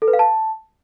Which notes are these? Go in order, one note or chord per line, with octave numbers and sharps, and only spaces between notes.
A4
B4
F5
A5